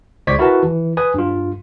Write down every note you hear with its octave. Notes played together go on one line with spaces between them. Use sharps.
C#2 C5 D5 C#6 G#6 B6
E4 F#4 A#4 B4 A5
E3
B4 G#5 D#6
G2 F4